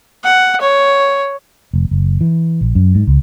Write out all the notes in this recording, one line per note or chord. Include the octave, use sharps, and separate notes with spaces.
F#5
C#5
F1
F#1
E3
A#1
F#2
G#2
C#2